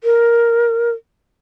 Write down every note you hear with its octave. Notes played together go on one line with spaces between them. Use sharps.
A#4